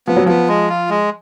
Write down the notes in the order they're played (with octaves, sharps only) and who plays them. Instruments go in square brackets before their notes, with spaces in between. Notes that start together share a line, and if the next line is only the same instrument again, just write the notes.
[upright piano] F3 [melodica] B3
[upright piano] F#3
[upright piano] F3 [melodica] B3
[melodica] G#3
F4
G#3